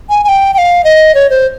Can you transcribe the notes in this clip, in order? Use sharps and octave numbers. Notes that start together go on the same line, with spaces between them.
G#5
G#5
G5
G5
F5
D#5
C#5
C5